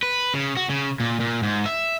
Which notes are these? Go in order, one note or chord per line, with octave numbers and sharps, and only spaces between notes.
B4
C#3
F#4
C#3
A#2
A#2
G#2
E5